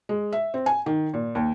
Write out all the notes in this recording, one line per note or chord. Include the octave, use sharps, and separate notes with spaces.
G#3
E5
C4
G#5
D#3
A#2
D#2